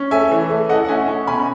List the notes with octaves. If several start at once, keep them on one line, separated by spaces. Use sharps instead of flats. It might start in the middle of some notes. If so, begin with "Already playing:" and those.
Already playing: C#4
A3 E5 G#5
E3
A3
A3 D#5 F#5
F#5
C#4 E5 G#5
C#4
B2 G#5 B5